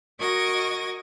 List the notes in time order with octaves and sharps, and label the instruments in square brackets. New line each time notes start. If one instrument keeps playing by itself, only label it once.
[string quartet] F#4 A#4 D#5 C#6 G#6 A#6